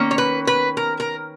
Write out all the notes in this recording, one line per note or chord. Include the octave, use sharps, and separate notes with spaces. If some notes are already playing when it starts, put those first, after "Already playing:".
Already playing: D#3 A#3 C#4
C#5
B4
B4
A#4
A#4